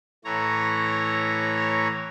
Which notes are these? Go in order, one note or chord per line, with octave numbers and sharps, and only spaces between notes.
A2 E3 C#5 A#5